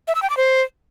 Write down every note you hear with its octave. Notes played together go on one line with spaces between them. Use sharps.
E5
E6
G5
D6
C5